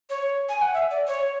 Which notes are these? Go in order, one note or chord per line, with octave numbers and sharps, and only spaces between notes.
C#5
G#5
F#5
E5
D5
C#5